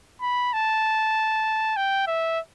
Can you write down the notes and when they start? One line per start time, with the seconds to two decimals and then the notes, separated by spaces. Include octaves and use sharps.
0.21 B5
0.53 A5
1.77 G5
2.07 E5